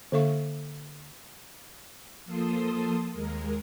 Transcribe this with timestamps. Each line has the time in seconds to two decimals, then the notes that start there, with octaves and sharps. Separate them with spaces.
0.12 D3 A#3 A4 E5 F5 C#6
2.25 F3 A#3 A4 A5 C6 D#6
3.12 D#2 G#3 A#4